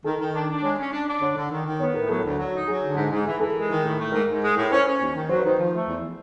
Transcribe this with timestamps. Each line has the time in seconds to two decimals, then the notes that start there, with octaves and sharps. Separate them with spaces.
0.04 D#3 A4
0.19 D#3
0.33 D4
0.49 D4
0.62 G#3 C#5
0.78 C#4
0.92 D4
1.07 D4
1.21 D3 C#5
1.36 D3
1.50 D#3
1.65 D#3
1.79 B3 C#5
1.94 A2 A#4
2.09 F#3 A4
2.23 D2
2.38 F#3
2.52 D#4
2.67 F#3 G#4
2.82 D3
2.96 G#2
3.11 G#2
3.25 E3 G#4
3.40 E3 A4
3.54 G#3 A#4
3.69 D#3
3.83 A2
3.98 A3
4.12 G#2 A#4
4.28 G#2
4.42 G#3
4.56 A2
4.71 C#4 C5
4.85 C#4
4.99 D#2
5.14 D#3
5.29 F#3 C5
5.39 B4
5.44 D#3 C5
5.59 F3
5.73 A3
5.88 E2